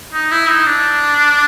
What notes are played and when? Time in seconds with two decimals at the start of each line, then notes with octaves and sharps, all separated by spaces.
0.13 D#4
0.31 E4
0.49 D#4
0.66 D4